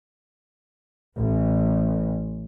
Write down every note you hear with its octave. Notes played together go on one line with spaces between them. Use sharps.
A1